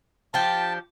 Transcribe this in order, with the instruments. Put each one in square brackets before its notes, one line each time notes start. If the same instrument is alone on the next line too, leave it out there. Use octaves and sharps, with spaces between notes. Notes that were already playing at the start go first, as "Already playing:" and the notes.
[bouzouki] F3 D4 G4 [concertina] A5